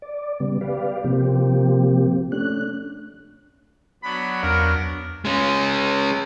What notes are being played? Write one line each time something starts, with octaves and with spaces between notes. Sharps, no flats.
D5
C#3 G3 B3
G4 B4 D5 F5
C3 F3 A#3 C4 G4
A3 C#4 D4 F#6
F#3 B3 D4 B5
E2 A#4
G#3 C#4